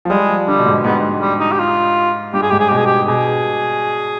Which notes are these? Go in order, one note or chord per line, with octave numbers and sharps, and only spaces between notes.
F3
G3 G#3
F3
D3 G3
B2
G#2
G#2 B3
G3
D#4
G4
F4
G2 G4
G#4
G#2 G4
G#4
B2 G4
G#4
G4
B2 G#4